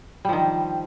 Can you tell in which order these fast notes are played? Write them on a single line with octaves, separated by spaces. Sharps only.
G3 F3 D#3